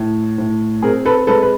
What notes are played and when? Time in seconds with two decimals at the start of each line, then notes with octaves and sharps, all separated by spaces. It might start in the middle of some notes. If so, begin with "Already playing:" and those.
Already playing: A2
0.38 A2
0.82 C4 G#4 A#4
1.05 A4 B4
1.27 G#3 A4 B4
1.43 B4